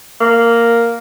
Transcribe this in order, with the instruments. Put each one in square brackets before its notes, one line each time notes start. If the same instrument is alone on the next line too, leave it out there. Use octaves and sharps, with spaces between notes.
[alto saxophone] A#3